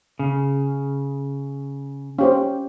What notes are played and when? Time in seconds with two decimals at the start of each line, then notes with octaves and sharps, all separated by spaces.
0.19 C#3
2.19 C#4 G4 C5